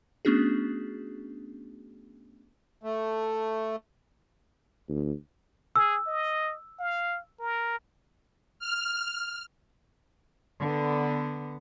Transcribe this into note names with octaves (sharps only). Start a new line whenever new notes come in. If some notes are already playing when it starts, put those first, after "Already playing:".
A3 B3 C#4 D4 F#4 G#4
A3
D2
G#4 E6
D#5
F5
A#4
F6
D3 B3